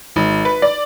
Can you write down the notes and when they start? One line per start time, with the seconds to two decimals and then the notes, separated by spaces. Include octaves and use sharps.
0.16 G#1
0.45 B4
0.62 D5